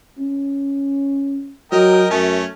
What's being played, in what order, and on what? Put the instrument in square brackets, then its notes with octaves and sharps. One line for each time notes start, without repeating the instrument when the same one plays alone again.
[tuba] C#4
[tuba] F#3 [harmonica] A#4 D#5 G5
[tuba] F#2 [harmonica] A3 C#4